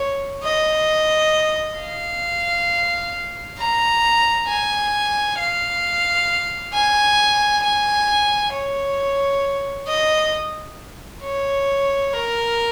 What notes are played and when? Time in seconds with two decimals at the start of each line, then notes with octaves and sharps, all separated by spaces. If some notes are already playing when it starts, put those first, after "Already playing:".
Already playing: C#5
0.44 D#5
1.79 F5
3.59 A#5
4.48 G#5
5.39 F5
6.73 G#5
7.63 G#5
8.53 C#5
9.88 D#5
11.23 C#5
12.13 A#4